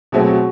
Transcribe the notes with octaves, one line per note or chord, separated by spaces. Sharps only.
B2 F#3 A3 C4 G#4
F#4